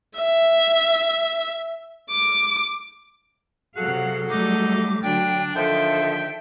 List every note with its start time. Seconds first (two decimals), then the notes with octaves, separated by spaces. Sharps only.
0.18 E5
2.10 D6
3.76 C3 F#3 F#4 G#4 A4 F5 F#5
4.30 F#3 G3 A3 D#4 D6
5.02 D3 F#3 D4 G5
5.55 D3 D#3 F3 A4 E5 G5